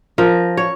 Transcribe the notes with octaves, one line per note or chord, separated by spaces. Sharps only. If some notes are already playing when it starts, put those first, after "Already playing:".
F3 A#4
C#5